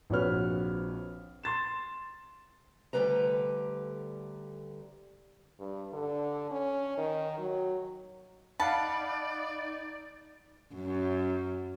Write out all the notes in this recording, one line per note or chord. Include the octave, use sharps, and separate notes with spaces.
A#1 C4 F#4 B4 C#5 F6
C6 A6 E7
D2 B2 D3 G3 B4 A#5
G2
D3
C#4
D#3
F#3
D#4 D5 F5 F#5 A5 B5
F#2